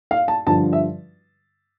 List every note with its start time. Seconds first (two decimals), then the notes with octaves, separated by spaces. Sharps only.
0.11 F5
0.28 A5
0.47 G2 D3 F3 A5
0.73 E5